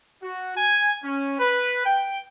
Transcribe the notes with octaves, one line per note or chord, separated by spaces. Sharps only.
F#4
G#5
C#4
B4
G5